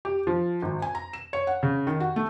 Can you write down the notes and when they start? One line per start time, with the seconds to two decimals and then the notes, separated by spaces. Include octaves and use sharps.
0.05 G4
0.27 F3
0.63 G#1
0.82 G#5
0.95 A#5
1.13 E7
1.33 C#5
1.47 F#5
1.63 C#3
1.87 D#3
2.00 F#4
2.16 A3